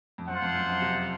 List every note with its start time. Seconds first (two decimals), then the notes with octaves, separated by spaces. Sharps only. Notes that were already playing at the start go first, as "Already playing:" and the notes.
0.18 F2
0.28 F#2 F4 C5 F#5
0.42 F2
0.55 F#2
0.69 F#2
0.82 C3